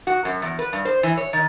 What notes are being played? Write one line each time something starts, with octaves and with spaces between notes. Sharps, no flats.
F#4
F#2
E2
B4
G2
C5
E3
C#5
D#3